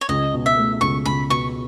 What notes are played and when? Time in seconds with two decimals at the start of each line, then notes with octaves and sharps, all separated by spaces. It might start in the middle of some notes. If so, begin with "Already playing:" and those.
0.01 C#5
0.08 C#2 D#5
0.34 B2
0.46 E5
0.57 A3
0.81 C#2 C#6
1.06 C#2 B5
1.30 B2 C#6